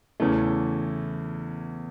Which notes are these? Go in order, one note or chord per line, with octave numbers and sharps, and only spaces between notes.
E2 C#3 E3 A3